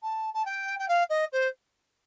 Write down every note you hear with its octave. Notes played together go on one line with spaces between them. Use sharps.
A5
A5
G5
G5
F5
D#5
C5